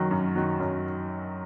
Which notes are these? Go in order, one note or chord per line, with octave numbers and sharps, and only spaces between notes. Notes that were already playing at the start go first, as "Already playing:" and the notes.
Already playing: F#2 D#3 F#3
F#2
D#3 F#3
F#2